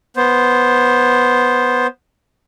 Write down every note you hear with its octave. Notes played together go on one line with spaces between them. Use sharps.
B3 C5